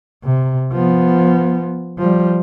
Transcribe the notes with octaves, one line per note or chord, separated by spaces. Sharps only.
C3
F3 B3
F3 G3